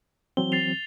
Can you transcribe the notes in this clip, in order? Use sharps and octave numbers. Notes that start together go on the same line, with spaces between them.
E3 F#3 C4 G7
A6 C7 F7